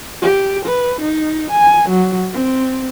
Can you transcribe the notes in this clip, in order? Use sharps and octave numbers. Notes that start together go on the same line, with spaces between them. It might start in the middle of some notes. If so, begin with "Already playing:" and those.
G4
B4
D#4
G#5
F#3
C4